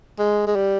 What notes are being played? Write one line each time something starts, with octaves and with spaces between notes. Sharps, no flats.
G#3
G#3
G3